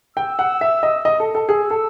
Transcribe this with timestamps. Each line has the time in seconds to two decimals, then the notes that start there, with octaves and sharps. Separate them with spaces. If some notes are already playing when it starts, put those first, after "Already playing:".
0.17 G5 E6
0.39 F#5
0.61 E5
0.83 D#5
1.05 D#5
1.20 A4
1.35 A4
1.49 G#4 E6
1.70 A4